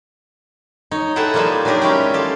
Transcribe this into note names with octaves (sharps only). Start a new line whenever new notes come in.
D#4 C#5
E4 G#4 A4 E5 F#5 G5
F3 G3 A#3 D#4 G#4
F#3 D4 D#4 G4 G#4 A#4
G#3 C#4 E4 C#5 D5 G5
F4 G4 A4